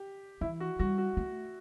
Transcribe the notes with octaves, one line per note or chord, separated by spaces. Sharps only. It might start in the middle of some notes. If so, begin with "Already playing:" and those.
Already playing: G4
E3 E4
F#4
G3 F#4
F#4
A3